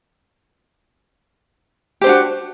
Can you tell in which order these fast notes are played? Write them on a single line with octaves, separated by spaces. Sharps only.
G4 C5 D4 F#4